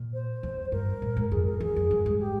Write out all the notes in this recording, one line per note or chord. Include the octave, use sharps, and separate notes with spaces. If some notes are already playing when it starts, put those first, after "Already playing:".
Already playing: A#2
C5
E2
G2 A#4
A#2
G#2
F2 G#4
A#4
E2 G#4
F2
G2
G#2
G4